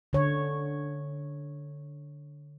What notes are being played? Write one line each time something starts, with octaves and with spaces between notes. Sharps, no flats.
D3 C#5